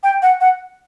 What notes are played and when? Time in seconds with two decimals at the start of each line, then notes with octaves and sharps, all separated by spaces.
0.03 G5
0.22 F#5
0.41 F#5